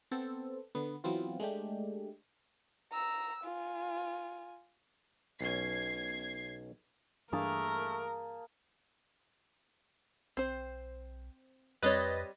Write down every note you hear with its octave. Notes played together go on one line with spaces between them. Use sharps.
B3 C4 A4
D3 B3
E3 F#3 B3 C4 F4
G#3 A3 D4 G4
A#5 E6
F4 G#5
B1 C#4 G#6 C7
G2 E3 A3 A#3 D4 G#4 A#4 A5
B1 C4 C5
F2 G3 C4 B4 C#5 D#5 A6